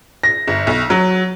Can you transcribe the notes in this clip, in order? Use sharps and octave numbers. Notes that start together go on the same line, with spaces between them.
A#6
G1
B1
F#3